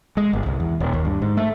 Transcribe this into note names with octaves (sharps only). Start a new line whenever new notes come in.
G#3
G1
C2
E2
D#1
D#2
G2
G#2
A3